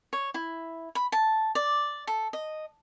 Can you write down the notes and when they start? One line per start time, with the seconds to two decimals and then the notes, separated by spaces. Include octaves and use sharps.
0.13 C#5
0.34 E4
0.95 B5
1.12 A5
1.55 D5
2.07 A4
2.33 D#5